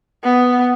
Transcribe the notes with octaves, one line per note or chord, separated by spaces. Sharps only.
B3